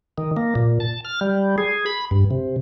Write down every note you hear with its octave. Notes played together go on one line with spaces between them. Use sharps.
D#3
A#3
A#2
A5
F6
G3
G#4
B5
G2
C3